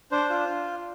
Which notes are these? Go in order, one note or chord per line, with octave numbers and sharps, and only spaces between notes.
D4 C5
F4